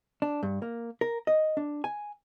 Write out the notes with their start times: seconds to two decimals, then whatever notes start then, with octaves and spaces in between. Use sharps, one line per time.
0.22 D4
0.43 G2
0.62 A#3
1.01 A#4
1.27 D#5
1.57 D4
1.84 G#5